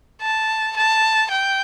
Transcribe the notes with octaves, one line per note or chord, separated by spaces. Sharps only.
A5
A5
G5